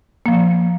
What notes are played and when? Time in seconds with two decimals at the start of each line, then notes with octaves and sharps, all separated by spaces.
0.26 F3 A#3